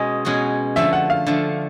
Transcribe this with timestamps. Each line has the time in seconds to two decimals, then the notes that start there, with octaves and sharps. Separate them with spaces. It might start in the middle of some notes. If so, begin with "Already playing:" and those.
Already playing: B2 G#3 C#4 D#5
0.25 B2 G#3 C#4 F#4
0.76 D3 F3 A3 E5
0.93 F#5
1.10 F5
1.27 D3 F3 A3